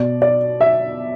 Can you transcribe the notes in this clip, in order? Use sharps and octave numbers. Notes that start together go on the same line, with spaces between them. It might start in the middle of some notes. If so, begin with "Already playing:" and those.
Already playing: B2 D5
D5
E5